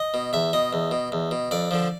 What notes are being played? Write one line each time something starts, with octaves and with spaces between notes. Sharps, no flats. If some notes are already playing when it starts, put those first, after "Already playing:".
Already playing: D#5
B2
E2 E5
B2 D#5
E2
B2
E2
B2
F2 D5
D3 F3